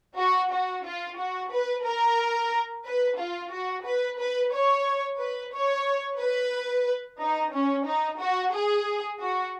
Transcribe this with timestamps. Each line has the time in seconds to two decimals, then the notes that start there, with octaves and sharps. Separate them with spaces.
0.17 F#4
0.51 F#4
0.84 F4
1.18 F#4
1.52 B4
1.85 A#4
2.85 B4
3.18 F4
3.51 F#4
3.84 B4
4.18 B4
4.51 C#5
5.18 B4
5.53 C#5
6.19 B4
7.19 D#4
7.52 C#4
7.86 D#4
8.20 F#4
8.53 G#4
9.19 F#4